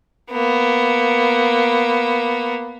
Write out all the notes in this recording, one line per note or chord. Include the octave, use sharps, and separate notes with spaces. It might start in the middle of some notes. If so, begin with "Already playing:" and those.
A#3 B3